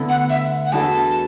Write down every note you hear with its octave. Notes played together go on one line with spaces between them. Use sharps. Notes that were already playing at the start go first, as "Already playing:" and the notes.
Already playing: D2 D3 A3 B3 D4 E4 A4
F#5
E5
F#5
F#5
E2 E3 D4 F#4 A4 A5